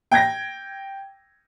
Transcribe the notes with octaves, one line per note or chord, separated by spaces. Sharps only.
G5 G#6 A#6